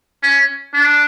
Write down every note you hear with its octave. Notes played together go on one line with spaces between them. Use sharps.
C#4
D4